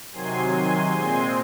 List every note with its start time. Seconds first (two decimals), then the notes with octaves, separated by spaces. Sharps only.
0.12 C3 D#3 F#3 G#5 C6
0.52 G#5 C6
0.91 A#2 G#3 C4 G#5 C6